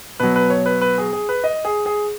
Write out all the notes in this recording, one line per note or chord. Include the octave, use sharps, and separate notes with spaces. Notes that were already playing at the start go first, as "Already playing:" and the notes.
B2 F#3 B4
B4
C#5
B4
B4
G#4
G#4
B4
D#5
G#4
G#4